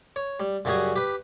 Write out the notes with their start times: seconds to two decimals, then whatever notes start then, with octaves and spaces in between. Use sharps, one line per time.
0.16 C#5
0.40 G3
0.65 F#2 C#3 G3 F#4 G#4 G#5
0.96 G4 B4